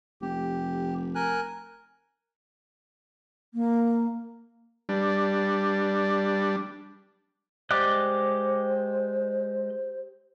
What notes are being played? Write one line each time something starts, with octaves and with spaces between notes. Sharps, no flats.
F1 G4
A#4 G#5 F#6
A#3
G3 D4
G#3 G4 C5 D5 D#5 F#6